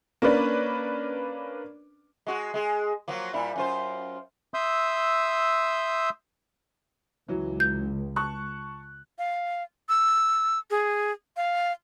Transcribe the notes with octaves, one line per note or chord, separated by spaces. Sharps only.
A#3 C#4 D4 B4 D5
G#3 F#4
G#3 G#4
F3 F#3 A#3
A#2 G3 E4
F#2 F4 C5
E5 C6 D#6 E6 G6
C#2 E3 F#3
G6
A5 C#6 F#6
F5
E6
G#4
F5